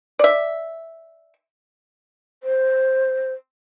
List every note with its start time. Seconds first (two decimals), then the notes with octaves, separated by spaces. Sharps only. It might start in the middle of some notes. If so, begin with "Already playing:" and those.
0.19 D5 E5
2.43 C5